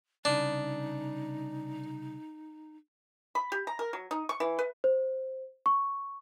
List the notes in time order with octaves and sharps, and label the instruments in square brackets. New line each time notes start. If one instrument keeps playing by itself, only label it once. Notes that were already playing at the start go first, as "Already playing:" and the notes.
[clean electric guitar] C2 C#3 [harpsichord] D4 [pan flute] D#4
[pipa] B5
G4
A#5
A#4
F#3
D#4
C#6
E3
B4
[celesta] C5
C#6